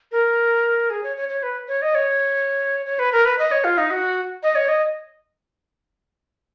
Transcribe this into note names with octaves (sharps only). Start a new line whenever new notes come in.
A#4
G#4
C#5
C#5
C#5
B4
C#5
D#5
C#5
C#5
B4
A#4
B4
D#5
C#5
F4
D#4
F#4
D#5
C#5
D#5